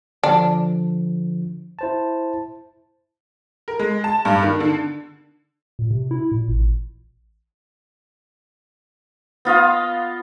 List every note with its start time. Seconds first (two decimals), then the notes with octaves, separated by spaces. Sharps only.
0.24 D3 F3 D4
1.79 E4 C5 A5
3.68 A#4
3.79 G#3
4.04 A5
4.25 G2
4.43 D#3
4.60 D3
5.79 A#2
5.91 C3
6.11 E4
6.32 A#2
6.48 A1
9.45 B3 F4 D#5 F5